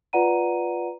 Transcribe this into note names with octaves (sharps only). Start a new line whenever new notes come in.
F4 B4 D5 F#5 A#5 D#7